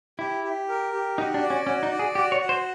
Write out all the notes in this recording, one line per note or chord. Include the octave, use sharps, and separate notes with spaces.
E4 G4
G4
A#4
G4
D#4 F#4
D4
D5
C#4
C#4 F#4
D#4
D5
G#4
F#4 G4
C#5
F#4
C5